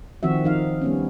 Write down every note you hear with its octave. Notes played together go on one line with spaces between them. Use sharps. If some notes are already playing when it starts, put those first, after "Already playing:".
D#3 F3 C4 F#4 E5
F3 D#4 F5
G3 B3 C#4